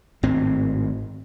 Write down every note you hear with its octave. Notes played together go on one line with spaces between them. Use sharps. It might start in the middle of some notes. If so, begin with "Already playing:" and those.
G#1 A2 C4